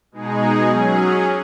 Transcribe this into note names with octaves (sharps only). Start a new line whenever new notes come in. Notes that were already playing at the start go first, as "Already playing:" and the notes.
B2 G#3 D#4 G#4
F#3 C#4 G#4